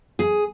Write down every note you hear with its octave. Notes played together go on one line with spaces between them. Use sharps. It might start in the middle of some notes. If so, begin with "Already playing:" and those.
G#4